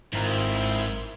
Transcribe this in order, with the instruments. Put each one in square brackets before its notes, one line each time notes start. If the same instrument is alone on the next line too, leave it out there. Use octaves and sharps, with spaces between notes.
[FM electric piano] G#1 A#4 [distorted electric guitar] G#2 [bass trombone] C4 [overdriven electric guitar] E4 F4